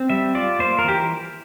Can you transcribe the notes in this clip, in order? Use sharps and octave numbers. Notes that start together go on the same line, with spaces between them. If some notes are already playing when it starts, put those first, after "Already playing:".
Already playing: C4
G3 E5
F4 D5
A#3 C5
A#4
E3 G4